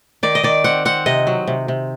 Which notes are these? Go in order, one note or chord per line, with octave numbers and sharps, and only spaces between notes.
D#3 D5
D#5
D#3 D5
C4 F#5
C4 F#5
C3 D#5
F#3
C3
C3